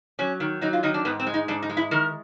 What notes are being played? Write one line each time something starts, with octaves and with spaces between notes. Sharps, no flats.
F#3 C#4
D#3
F#3 D#4
F4
D#3 D#4
D4
G#2 B3
C4
G#3
D#4
G#2 D4
D#4
G#3
E4
D#3 A#4